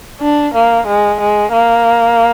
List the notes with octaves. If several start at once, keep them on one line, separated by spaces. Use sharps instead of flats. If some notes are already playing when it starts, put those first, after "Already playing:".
D4
A#3
G#3
G#3
A#3